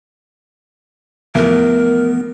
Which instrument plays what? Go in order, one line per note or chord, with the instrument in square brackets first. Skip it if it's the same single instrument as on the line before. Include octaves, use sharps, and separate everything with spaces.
[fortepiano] E2 [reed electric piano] E3 F3 A3 [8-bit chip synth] B3 [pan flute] A#4